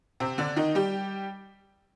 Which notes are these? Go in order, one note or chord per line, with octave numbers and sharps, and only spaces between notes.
C3 C4
D3 D4
D#3 D#4
G3 G4